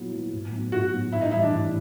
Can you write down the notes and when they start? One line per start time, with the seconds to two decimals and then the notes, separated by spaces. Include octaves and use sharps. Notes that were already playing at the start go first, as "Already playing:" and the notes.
Already playing: A#2 F#3 B3 E4
0.13 F#3 B3 E4
0.33 A2
0.52 F#3 B3 D#4
0.72 A2 F#4
0.92 F#3 B3 D#4
1.12 A2 E4
1.21 D#4
1.31 E3 G3 E4
1.42 D4
1.51 A2